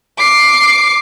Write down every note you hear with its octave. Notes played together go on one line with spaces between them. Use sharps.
D6 C7